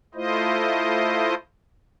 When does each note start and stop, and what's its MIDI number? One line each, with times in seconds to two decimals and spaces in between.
0.15 1.34 57
0.15 1.34 64
0.15 1.34 65
0.15 1.34 72
0.15 1.34 75